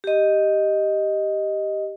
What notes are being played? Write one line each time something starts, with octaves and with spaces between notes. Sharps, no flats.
G4 D#5